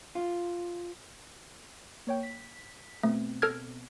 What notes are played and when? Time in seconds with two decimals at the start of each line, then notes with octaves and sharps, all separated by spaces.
0.15 F4
2.07 A#3 C#5 G5
2.23 B6
3.03 B2 A3 B3 C4
3.42 A4 F6 G#6